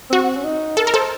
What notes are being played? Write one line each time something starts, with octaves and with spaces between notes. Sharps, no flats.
C4 F#4
C#4
D#4
A4 A#4
A#4
A4 C5